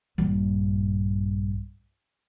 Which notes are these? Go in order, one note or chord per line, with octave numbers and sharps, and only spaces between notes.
A#1 G2